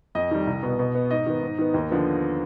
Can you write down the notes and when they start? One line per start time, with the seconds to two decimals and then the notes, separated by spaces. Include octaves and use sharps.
0.15 F2 D#5
0.31 D#3 G3
0.47 C2
0.63 B2 B3
0.79 B2
0.95 B3
1.11 G#2 D#5
1.26 D#3 B3
1.43 G#2
1.58 D#3 B3
1.74 D#2
1.90 D3 F3 B3